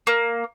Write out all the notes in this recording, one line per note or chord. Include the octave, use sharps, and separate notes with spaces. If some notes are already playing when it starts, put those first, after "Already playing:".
A#3